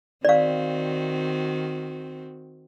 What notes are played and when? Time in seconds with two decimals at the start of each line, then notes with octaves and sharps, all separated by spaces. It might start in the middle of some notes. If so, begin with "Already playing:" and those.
0.25 D#3 C4 F#4 D5 F5